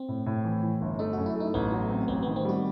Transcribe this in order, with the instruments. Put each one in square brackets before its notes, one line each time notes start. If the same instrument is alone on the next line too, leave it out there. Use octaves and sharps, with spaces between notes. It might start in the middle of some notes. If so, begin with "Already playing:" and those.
Already playing: [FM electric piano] C4
[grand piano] A2
A2
E3
E3
G1
[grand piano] A3 [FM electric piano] D#4
[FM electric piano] F#4
[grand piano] F#2
[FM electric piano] E4
[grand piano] A3 [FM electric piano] D#4
[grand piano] A1 [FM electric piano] B3
[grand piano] F#3
C4
[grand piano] A1 [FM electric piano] B3
[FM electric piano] B3
[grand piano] D#3
[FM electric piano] C4
[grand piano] G3 [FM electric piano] F#4